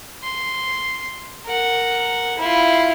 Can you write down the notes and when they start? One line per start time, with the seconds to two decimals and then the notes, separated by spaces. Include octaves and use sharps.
0.23 C6
1.46 A#4 F#5
2.38 E4 F4